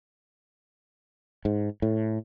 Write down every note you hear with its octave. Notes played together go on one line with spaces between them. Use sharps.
G#2
A2